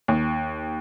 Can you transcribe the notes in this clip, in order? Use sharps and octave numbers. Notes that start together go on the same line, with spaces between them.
D#2